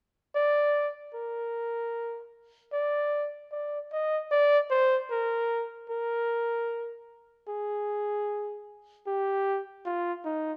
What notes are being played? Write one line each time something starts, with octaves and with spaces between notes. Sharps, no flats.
D5
A#4
D5
D5
D#5
D5
C5
A#4
A#4
G#4
G4
F4
D#4